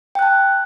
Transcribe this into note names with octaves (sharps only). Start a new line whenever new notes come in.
G5 A5 F#6